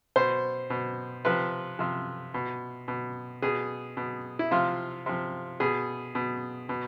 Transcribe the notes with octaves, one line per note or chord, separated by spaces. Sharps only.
B2 C5
B2
C3 F3 B4
C3 F3
B2
B2
B2 G#4
B2
E4
C3 F3 F4
C3 F3
B2 G#4
B2
B2